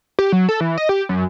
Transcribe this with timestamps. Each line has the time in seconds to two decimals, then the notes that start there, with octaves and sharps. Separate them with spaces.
0.19 G4
0.32 F#3
0.49 A4
0.60 E3
0.78 D#5
0.89 G4
1.09 F#2